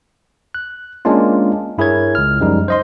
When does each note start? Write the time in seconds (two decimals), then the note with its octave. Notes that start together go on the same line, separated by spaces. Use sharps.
0.54 F#6
1.05 G#3 A#3 C#4 D4 F4
1.78 G2 E4 G#4 A#4 C#5 G#6
2.15 C#2 F6
2.41 F#2 F3 G3 G#3 D#4
2.68 C5 D#5 C6